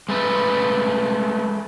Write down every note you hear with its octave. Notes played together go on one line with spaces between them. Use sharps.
G#3 A3 B4